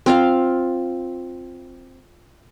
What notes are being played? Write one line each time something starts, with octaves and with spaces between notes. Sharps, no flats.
C4 F4 F5